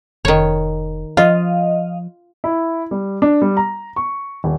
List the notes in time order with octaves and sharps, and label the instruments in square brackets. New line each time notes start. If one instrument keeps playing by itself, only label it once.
[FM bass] F1 [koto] D#3 C#5
[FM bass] F3 [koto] F4 [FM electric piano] D#5 F5
[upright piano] E4
G3
D4
G3
A#5
C#6
D#1